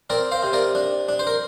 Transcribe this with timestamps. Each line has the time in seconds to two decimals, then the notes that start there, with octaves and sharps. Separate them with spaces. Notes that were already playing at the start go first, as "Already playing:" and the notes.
0.10 C4 A#4 D5
0.32 C5 F5
0.43 C3
0.53 A#4 D5
0.75 D4
1.09 D4
1.19 C5
1.27 A#4